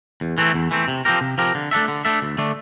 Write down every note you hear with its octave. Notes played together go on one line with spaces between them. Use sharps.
E2
E3 A3 C4
E2
E3 A3 C4
C3
F3 C4 G4 A#4
C3
F3 C4 G4 A#4
D3
A3 D4 A4 E5
D3
A3 D4 A4 E5
D2
D3 A3 D4